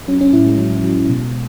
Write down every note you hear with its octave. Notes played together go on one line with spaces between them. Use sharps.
F#3 C#4
C#4
A2 E4
G#3
F#3
F#3
B2